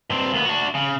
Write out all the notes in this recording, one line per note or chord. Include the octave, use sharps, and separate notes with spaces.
G2 C4
D#2 B3
D4 F#4
C#3